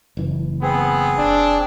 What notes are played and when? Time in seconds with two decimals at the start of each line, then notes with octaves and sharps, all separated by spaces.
0.17 F#1 E3
0.62 B3 C4 G#4
1.18 F1 D4